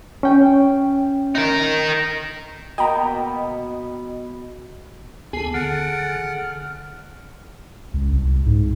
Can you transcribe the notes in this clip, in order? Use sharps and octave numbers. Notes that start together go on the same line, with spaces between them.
C#4 G5
D#4 A#4
B2 A#3 B3 D#5 G5 A#5 B5
D2 B3 G#4 A4 G#5 C7
D3 F#5 F6
C#2
C2
G#2